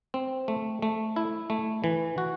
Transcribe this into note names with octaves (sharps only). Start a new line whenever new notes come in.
C4
A3
A3
E4
A3
E3
F#4